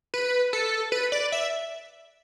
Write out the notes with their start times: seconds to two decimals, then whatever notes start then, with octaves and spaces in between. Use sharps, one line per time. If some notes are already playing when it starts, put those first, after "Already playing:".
0.14 B4
0.53 A4
0.92 B4
1.12 D5
1.32 E5